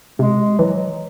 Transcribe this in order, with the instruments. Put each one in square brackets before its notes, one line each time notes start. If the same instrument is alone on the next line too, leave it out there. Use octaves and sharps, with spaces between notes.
[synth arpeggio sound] C3 [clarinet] G#3
[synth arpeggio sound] E3 [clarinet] F#3